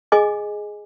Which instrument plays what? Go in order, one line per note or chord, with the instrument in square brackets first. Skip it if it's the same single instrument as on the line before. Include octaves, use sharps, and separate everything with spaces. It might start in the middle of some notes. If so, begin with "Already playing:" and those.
[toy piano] G#4 D#5 G#5 D6